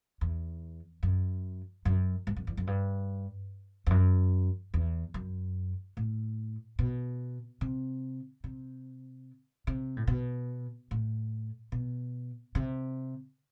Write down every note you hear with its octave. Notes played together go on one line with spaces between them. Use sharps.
E2
F#2
F#2
G2
F#2
E2
F#2
G2
E2
F#2
E2
F#2
A2
B2
C3
C3
C3
A2
B2
A2
B2
C3